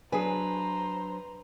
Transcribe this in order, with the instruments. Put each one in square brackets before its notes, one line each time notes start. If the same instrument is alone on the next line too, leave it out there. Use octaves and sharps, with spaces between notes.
[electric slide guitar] F#3 D4 [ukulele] G#4 G#5 [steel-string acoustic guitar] B4 [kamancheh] C5 A#5